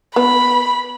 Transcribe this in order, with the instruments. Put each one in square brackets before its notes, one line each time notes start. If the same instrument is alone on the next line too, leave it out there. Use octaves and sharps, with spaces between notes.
[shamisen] B3 [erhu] B5